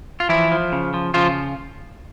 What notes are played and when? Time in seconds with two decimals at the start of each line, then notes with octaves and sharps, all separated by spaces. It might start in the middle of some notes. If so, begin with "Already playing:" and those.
0.20 F4
0.29 E3 F3 E4
0.51 F3
0.72 C#3
0.94 F3
1.14 C#3 F3 F4